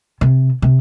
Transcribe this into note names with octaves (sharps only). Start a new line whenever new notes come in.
C3
C3